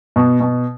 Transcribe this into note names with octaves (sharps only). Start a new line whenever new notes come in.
B2
B2